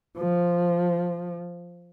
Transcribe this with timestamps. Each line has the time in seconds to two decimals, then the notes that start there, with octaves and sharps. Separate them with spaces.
0.17 F3